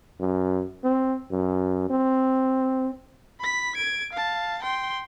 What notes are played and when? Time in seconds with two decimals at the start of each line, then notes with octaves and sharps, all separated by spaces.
0.20 F#2
0.84 C4
1.31 F#2
1.90 C4
3.40 B5 B6
3.75 G#6 D7
4.13 F5 A5
4.62 G5 C6